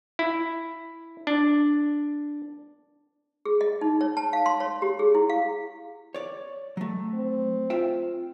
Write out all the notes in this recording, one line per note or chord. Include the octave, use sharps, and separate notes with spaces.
E4
D4
G#4
D#5
D#4
C#5
A5
F5
C6
C#5
G4
G#4
E4
F5
C#5 D5
F#3 A3
C4
F4 E5 G5